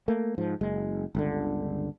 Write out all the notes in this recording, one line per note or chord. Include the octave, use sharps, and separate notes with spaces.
A3 A#3
G#2 F3
F#1 G#3
G1 C#2 D3